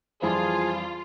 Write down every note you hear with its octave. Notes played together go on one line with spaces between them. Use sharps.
F2 E3 F3 G3 F4 G#4